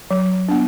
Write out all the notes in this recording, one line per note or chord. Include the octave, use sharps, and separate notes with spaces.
F#3
B3 D4